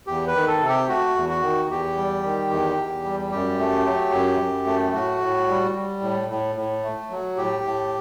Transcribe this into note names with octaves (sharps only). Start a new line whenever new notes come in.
E2 G4
B4
D#3
A4
C3
G4
A3 F#4
E2
F#4
D#3
E2 G4
G3
D#3
E2
E2
G3
F#2 G4
A3
F#3
F#2
F#2
A3
A2 F#4
A2
G3
G3
A2
A2
A2
A3
F#3
A2 G4
A2